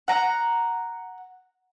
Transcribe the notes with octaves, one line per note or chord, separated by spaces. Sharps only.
F#5 A#5